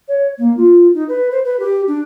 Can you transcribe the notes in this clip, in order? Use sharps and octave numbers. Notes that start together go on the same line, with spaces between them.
C#5
A#3
F4
D#4
B4
C5
B4
G4
D4